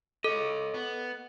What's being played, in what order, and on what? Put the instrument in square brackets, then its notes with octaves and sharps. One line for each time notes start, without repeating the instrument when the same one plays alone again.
[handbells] A4 [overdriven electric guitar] C#5 D#5
[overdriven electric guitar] B3